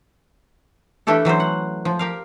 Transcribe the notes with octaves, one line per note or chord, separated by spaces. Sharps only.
E3 A3 D4 G4 A4
E3 F#3 C#4 C5
F#5
F3
G4 A#4 F5